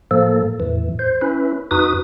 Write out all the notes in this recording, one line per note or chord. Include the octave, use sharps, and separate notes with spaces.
A2 F3 A#3 A4
E2 A2 E3
C5
C#4 E4 B4
F2 D#4 F#4 B4 D#6